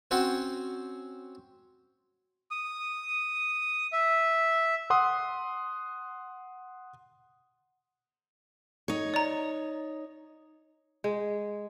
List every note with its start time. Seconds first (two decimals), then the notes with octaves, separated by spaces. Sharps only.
0.11 C4 C#4 F#4 C5 C#5
2.51 D#6
3.93 E5
4.90 F#5 C6 D#6
8.88 D#4 C#5
9.14 D5 A#5
11.04 G#3